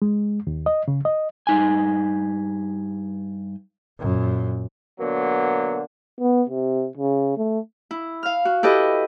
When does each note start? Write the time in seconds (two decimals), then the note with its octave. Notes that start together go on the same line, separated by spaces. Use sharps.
0.02 G#3
0.47 D#2
0.66 D#5
0.88 C#3
1.05 D#5
1.47 G2 D#4 G#5
4.00 F#2 A#2
5.00 B2 D3 F#3 A#3
6.20 B3
6.49 C3
6.97 C#3
7.37 A3
7.91 E4
8.23 F5 F6
8.45 F#4
8.63 E4 G4 A4 B4 D#5